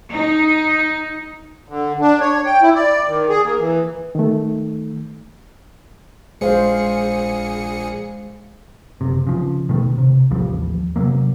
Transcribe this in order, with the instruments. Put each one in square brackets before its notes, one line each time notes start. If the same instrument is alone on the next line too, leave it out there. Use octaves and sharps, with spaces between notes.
[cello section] D#4
[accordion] D3
D4
C#5
G5
E4
D5
D#3
G#4
A#3
E3
[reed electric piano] D#3 A3
[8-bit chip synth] A#1 G#4 C#7 [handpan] G#3 C5 F5
[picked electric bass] F#1 C3
C#3 F3
B2 D#3 A3
C3
A1 D#2 F3 G3
C3 F#3 A#3